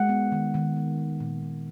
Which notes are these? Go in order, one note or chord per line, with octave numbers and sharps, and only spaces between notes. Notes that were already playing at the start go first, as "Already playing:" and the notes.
Already playing: G#3 F#5
B3
D#3
D#3
B3
G#3
A#2
A#2